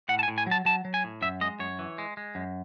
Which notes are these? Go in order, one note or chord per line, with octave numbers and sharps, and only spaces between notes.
A2 F#5
A5
G#5
A2
G#5
F#3 A5
F#3 A5
F#3
G#5
A2
F#2 E5
G#3 D#5
F#2 C#5
E3
G#3
G#3
F#2